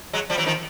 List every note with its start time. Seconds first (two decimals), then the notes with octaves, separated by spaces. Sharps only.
0.13 F#3 G#3
0.30 F3 G3
0.38 E3 F#3
0.46 D#3 F3